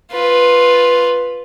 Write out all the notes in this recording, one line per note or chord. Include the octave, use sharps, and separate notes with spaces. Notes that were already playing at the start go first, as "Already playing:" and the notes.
F4 B4